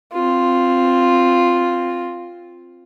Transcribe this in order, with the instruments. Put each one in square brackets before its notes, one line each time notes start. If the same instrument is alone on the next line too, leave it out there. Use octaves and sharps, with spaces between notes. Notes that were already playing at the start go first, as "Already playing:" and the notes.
[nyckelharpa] C4 F4